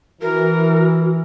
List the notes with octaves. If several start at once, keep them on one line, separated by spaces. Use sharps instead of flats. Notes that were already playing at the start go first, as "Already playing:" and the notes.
E3 F#4 A#4